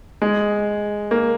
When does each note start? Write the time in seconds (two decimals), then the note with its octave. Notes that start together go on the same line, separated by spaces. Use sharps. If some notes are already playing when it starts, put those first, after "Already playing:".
0.22 G#3
1.11 A#3